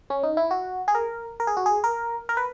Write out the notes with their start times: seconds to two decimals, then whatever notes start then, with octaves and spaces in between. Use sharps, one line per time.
0.10 C#4
0.23 D#4
0.37 E4
0.51 F#4
0.88 G#4
0.95 A#4
1.40 A#4
1.47 G#4
1.57 F#4
1.66 G#4
1.84 A#4
2.29 A#4
2.37 B4